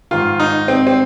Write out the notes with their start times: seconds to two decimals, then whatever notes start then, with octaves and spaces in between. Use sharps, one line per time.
0.11 G#2 D#3 F4
0.40 D#4
0.68 C4
0.87 C4